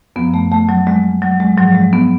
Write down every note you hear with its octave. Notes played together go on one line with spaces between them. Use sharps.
F#2 F3 B3
A3
A3
F#3
G#3
F#3
G#3
G#2 F3 F#3
G#3
B3